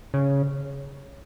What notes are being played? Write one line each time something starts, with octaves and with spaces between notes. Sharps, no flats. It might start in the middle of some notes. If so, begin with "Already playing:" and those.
C#3